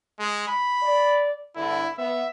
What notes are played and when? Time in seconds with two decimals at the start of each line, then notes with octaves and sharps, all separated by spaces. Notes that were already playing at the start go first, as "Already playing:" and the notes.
0.19 G#3
0.48 B5
0.82 D5
1.56 E2 G2 D3 E4
1.98 B3 E5